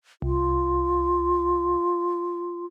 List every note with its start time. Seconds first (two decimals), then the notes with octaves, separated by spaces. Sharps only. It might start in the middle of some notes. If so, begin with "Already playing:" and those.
0.22 C2 F4